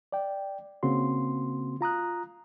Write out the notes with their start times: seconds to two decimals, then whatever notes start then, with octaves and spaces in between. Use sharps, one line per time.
0.12 D5 G5
0.83 C#3 A#3 C4 F#4 C6
1.81 F4 A#5 D#6 F#6